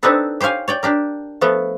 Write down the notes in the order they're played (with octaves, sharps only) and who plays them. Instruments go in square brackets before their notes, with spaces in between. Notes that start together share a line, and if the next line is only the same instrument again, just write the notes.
[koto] C4 D4 D#4 G4 A4 B4
G4 C5 C#5 F5 G#5
C#5 D5 G5
D4 G4 A#4
F3 A3 B3